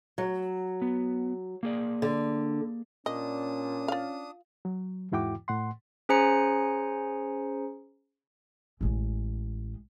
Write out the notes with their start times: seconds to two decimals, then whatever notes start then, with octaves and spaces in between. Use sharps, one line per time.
0.18 F#3
0.82 B3
1.63 A#3 G#4 D5
2.02 D3
3.06 A#2 C#4 D4 D#5 D#6
3.88 F4 F5
4.65 F#3
5.12 E2 G#2 E4 F#4 G5 D6
5.48 A2 F#5 C6
6.09 C#4 G#4 C5 G#5 A#5 C#7
8.81 A1 G#3